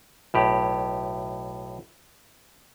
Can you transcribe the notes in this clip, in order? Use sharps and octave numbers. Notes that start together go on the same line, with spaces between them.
B1 A2 G4